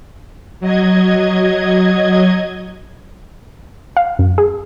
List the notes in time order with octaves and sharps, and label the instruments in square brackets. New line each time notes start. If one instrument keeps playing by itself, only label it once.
[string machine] F#3 D#5 G#6
[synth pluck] F5
F#2
G#4